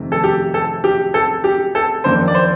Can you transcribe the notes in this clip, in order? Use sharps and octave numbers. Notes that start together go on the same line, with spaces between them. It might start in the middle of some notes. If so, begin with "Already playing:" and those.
Already playing: F2 C3 D#3 A3
A4
G4
A4
G4
A4
G4
A4
F2 D#3 A#3 D4 C5
D5
C5